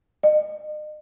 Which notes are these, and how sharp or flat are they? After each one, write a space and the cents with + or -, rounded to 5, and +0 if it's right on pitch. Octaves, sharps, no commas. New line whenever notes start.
D#5 -40